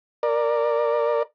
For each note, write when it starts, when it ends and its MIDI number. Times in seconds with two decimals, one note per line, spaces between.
0.23 1.23 70
0.23 1.23 74